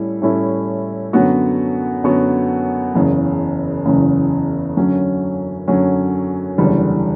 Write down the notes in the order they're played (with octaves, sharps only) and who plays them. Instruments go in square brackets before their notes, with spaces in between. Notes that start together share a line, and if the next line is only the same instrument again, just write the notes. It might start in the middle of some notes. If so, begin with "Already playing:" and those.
Already playing: [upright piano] A2 G3 C#4 E4 A4
A2 G3 C#4 E4 A4
F#2 D3 F#3 B3 F#4
F#2 D3 F#3 B3 F#4
F#1 E2 C#3
F#1 E2 C#3
F#2 D3 F#3 C#4
F#2 D3 F#3 C#4
F#1 E2 D3 G3